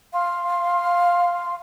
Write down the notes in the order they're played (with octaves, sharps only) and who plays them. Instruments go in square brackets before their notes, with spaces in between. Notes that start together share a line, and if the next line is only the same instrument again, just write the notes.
[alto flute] F5 [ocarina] C6